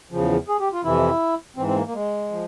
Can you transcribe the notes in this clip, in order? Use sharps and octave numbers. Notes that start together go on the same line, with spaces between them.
E2 C#3 F3
G#4
G4
F4
F2 C3 E3 E4
G#2 E3 C4
C4
A#3
A#3
G#3
F3